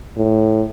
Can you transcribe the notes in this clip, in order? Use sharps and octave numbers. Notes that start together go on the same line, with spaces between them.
A2